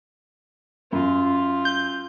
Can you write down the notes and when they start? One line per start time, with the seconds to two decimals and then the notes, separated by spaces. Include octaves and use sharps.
0.92 F#2 F4
1.65 G6